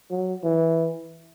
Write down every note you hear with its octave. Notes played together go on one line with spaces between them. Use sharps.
F#3
E3